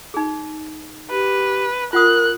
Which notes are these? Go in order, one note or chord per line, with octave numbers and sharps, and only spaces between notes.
D#4 G#4
G4 B4
F4 A#4 F#5 D#6 F#6